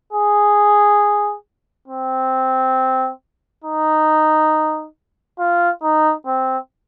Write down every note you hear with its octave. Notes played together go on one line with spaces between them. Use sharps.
G#4
C4
D#4
F4
D#4
C4